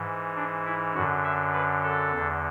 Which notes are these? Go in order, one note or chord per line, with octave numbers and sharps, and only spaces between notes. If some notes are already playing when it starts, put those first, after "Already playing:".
Already playing: G#2 E3
D4
E4
F#2 D3 F#4
E5
B4
A4
E2
D3